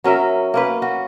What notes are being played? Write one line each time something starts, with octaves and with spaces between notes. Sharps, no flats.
F#3 C#4 A#4 E5
A#3 C#4 B4
F#4